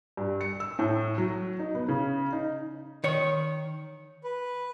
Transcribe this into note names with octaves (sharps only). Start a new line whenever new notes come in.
G2
C#7
E6
A2
F#3
D#4
B3
C#3
D#4
D#3 C#5
B4